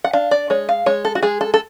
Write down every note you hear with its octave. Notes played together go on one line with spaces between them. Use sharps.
F#5
D4 F5
D5
G#3 C#5
F5
G#3 C#5
A4
F#4
G#3 G#4
A4
A4